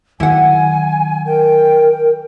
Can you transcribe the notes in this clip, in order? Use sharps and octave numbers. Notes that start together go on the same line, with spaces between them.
D#3 F#3 E4 F#5 G#5
A#4 G5